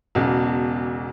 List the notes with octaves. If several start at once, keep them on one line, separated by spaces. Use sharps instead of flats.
E1 B1 C#3